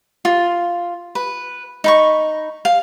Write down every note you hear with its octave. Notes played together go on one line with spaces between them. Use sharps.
F4
B4
D#4 B5 C#6
F5